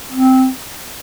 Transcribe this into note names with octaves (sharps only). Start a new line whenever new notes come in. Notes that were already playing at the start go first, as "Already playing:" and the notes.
C4